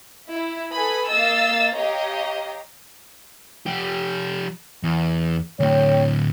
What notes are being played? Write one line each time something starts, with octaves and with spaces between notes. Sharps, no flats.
E4
A4 B4 G#5 B5 D#6
A#3 D#5 F5 E6 A6
G4 C#5 D#5 F5 A#5
F3 G4
E2
D2 A2 C#5 G5